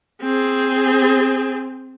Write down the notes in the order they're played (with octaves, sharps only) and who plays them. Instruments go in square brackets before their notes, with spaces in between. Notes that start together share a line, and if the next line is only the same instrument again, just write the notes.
[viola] C4 G#4